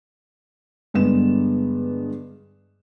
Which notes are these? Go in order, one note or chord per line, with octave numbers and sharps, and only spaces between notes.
G2 D3 G#3 B3 E7